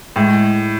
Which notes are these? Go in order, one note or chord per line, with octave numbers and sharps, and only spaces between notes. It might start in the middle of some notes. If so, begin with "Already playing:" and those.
A2 G#3